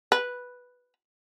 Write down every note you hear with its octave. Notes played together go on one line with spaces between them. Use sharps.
B4